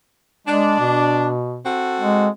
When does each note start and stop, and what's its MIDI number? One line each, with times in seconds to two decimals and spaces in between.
0.47 0.77 56
0.47 1.29 62
0.80 1.64 47
1.64 2.28 60
1.64 2.28 66
1.64 2.28 69
2.00 2.29 56